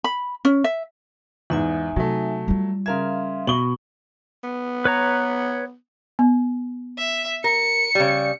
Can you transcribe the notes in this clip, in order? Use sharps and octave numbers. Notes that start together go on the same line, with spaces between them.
B5
C#4
E5
E2 G#2 D#4 E5 G#5
C3 F#3 A3
G3 F4
C#3 A#4 E5 F5 C6 G#6
B2 F#7 G7
B3
B4 C#5 A#5
B3
E5
A#4 C#7
C#3 G3